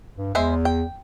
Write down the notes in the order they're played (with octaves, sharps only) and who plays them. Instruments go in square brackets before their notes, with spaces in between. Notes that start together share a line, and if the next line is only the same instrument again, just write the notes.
[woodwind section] G2
[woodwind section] E2 [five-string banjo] G#3 C5 E5
[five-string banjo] G5